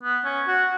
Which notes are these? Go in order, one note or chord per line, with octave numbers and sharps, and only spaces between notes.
B3
C#4
F#4